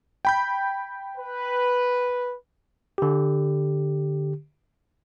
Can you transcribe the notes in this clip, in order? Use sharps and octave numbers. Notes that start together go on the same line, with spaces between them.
G5 B5 G6
B4
D3 G4